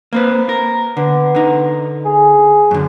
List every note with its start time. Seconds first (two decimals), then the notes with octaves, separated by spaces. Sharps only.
0.13 A#3 C4 B4
0.49 A#4
0.97 D3 B3
1.35 D3 D#4
2.05 G#4
2.71 F#2 D3